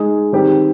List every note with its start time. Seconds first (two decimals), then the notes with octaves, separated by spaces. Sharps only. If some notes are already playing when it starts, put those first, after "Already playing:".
Already playing: G#3 D#4 G#4
0.32 D#3 G3 C4 G4